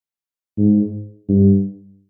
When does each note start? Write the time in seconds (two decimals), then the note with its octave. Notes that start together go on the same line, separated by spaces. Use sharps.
0.58 G#2
1.29 G2